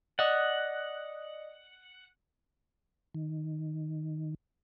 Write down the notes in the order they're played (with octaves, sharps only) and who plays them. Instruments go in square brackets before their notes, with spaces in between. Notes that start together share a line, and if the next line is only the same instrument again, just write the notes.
[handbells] D5 D#5 D#6 [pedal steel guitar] F#5
[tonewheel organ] D#3